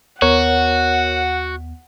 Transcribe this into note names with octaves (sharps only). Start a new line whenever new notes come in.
D#2 B3 F#4 A#4 C#5 F#5